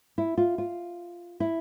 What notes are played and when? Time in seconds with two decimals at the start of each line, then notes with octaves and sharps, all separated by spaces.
0.18 E4
0.38 F4
0.58 F4
1.40 E4